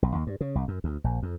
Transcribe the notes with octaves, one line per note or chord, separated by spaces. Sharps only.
B1
D#2
G2
C#3
C2
F#2
D2
A#1
F2